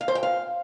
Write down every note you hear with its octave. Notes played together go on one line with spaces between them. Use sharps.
F5
C5
G5
F5